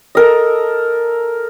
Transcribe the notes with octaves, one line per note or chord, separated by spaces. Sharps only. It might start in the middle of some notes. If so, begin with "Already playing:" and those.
A4 A#4 D#5